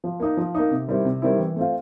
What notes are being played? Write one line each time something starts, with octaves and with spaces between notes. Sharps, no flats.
F3
A#3 D#4
F3
A#3 D#4
C3
D#3 G3 C4 E4
C3
D#3 G3 C4 E4
E3
A3 C4 F4